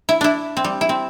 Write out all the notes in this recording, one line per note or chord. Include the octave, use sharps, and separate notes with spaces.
E4
D4 E4
C4
G3
E4
C4